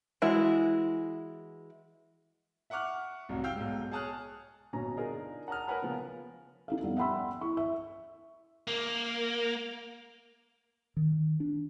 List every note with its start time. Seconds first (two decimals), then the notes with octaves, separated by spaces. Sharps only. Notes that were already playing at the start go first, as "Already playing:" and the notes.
0.22 E3 G#3 E4 F#4
2.70 E5 F#5 C#6 D6 F6 F#6
3.29 C2 F#2 A2
3.44 F5 G5 E6 G6
3.56 B1 G#2
3.91 G#4 C#5 A5 D#6 F6 F#6
4.73 G1 B2 C#4 A#5
4.97 D4 D#4 F4 G#4 A#4
5.48 F#5 A5 A#5 D#6 F6
5.68 A#4 B4 C#5 F#5 G#5 B5
5.82 C#3 F3 B3
6.68 D#4 A4 F5
6.83 F2 G3 B3
6.97 E5 F#5 G5 B5 C6 E6
7.41 E4 C#6
7.57 E5
8.67 A#3
10.97 D#3
11.40 D4